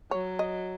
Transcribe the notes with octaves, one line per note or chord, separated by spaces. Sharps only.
F#3 C#5
D#5